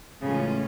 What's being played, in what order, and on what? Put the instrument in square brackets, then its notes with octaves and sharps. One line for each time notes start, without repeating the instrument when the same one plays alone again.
[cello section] A2 E3 G#3 C#4 F4 [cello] C#3